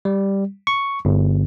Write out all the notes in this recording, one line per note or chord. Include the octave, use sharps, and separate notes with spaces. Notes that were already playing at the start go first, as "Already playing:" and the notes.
G3
C#6
G1